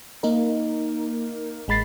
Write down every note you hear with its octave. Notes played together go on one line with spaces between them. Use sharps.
A#3 D#4 A#4
A1 G#3 B5 A6 C7